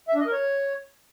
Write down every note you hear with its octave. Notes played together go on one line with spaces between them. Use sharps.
E5
D4
D#5
A#4
C#5